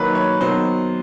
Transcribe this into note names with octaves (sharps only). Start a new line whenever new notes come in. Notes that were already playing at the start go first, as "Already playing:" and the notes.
Already playing: D#3 F#3 A#3 B4
C#5
D#3 F#3 B3 C5